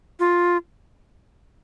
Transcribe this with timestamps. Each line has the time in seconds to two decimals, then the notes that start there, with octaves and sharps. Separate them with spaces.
0.20 F4